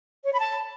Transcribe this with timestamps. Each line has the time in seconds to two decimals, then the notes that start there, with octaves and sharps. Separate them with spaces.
0.25 C#5
0.32 B5
0.40 A5